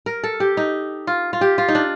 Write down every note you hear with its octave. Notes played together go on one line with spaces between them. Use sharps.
A#4
A4
G4
D#4
F4
F4
G4
F4
D#4
D4